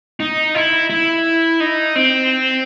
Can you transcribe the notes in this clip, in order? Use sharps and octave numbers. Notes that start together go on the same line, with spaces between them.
D#4
E4
E4
D#4
C4